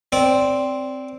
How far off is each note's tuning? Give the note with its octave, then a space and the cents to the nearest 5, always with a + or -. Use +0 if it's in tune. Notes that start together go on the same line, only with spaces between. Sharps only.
C4 +0 D5 -20